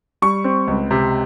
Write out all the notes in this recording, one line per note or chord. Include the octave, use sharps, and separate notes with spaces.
G3 C#6
C4
C#2
C3